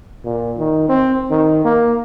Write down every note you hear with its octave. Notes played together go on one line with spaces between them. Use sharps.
A#2
D#3
C4
D#3
A#3